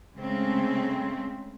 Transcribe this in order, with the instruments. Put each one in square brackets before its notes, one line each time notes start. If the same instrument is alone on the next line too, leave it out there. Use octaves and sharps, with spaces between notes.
[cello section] C#3 G#3 A3 C4